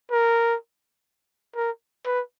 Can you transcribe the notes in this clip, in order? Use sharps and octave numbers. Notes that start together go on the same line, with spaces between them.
A#4
A#4
B4